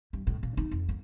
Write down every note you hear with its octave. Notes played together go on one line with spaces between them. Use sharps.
G2
A2
A#2
D#4
F2
A#3